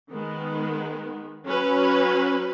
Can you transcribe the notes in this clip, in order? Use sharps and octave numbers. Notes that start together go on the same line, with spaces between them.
D#3 G#3 B3
F#3 C#4 F#4 B4